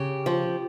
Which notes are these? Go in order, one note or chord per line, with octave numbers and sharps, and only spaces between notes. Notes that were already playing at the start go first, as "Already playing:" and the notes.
Already playing: C#3 G4
F3